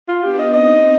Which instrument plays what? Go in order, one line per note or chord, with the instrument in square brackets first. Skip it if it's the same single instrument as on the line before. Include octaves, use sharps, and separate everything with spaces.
[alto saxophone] F4
[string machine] B3 D4 [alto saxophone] G4
[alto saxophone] D#5
[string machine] C4 D#4 [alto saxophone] D#5